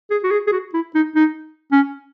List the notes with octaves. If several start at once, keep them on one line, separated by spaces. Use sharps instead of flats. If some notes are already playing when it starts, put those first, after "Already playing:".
G#4
F#4
G#4
G#4
F#4
E4
D#4
D#4
C#4